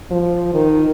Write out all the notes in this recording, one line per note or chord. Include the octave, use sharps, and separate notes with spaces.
F3
D#3